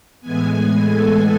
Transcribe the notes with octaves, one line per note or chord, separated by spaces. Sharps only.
A2 E3 G#3 B3 G#5
A4